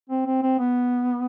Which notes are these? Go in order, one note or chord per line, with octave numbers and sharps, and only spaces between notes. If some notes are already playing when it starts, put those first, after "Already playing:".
C4
C4
C4
B3